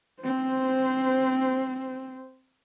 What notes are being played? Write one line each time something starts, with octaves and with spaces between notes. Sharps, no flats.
C4 C5